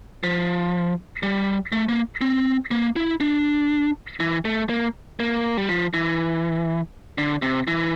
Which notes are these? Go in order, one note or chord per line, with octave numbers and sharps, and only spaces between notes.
F3
G3
A3
A#3
C4
A#3
E4
D4
E3
A3
A#3
A#3
G3
F3
E3
D3
C3
E3